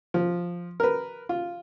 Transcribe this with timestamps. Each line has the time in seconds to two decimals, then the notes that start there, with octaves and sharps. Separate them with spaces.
0.14 F3
0.80 A#4 B4
1.29 F4